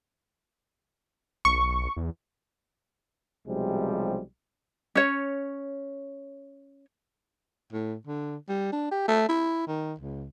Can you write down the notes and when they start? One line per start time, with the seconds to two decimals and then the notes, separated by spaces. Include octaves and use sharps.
1.45 B1 C#6
1.97 E2
3.47 B1 C3 F3 G3 G#3
4.95 C#4 C#5
7.73 A2
8.07 D3
8.49 G3
8.72 D4
8.91 G4
9.08 A3
9.28 E4
9.67 D#3
9.99 C#2